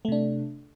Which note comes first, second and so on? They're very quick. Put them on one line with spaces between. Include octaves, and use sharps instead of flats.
A3 C3 D4